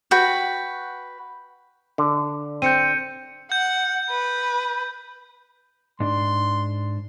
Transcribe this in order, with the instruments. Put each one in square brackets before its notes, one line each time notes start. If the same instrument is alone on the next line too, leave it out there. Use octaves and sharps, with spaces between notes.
[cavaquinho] F#4 B4 G5
[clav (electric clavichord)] D3
[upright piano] C4 [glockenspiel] G6 C#7 D#7
[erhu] F#5 [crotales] G6
[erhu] B4
[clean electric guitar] G#2 D4 [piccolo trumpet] C6